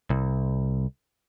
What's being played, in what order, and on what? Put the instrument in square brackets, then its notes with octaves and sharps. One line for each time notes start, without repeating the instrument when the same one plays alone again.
[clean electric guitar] C2